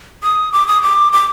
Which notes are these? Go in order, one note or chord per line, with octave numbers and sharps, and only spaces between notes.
D#6
D6
D#6
D6
D6